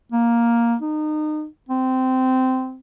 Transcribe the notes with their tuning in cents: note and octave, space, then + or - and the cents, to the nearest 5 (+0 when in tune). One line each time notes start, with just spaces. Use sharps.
A#3 +5
D#4 -30
C4 -15